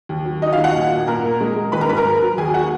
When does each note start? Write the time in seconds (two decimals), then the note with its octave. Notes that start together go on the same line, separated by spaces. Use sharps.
0.09 D#2
0.25 F#3
0.42 F#3 D#4 D#5
0.53 F4 F5
0.58 D#2
0.63 F#4 F#5
0.75 A#2
0.91 A#3
1.07 A#2 A#4 A#5
1.24 A#3
1.41 G#3
1.56 G#3
1.72 D#3 B4 B5
1.81 A#4 A#5
1.88 G#2 B4 B5
1.97 A#4 A#5
2.06 F#3
2.22 F#3
2.38 D#2 G#4 G#5
2.54 A#3 F#4 F#5